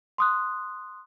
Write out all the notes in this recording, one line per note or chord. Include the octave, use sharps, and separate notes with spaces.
C6 D#6 F#6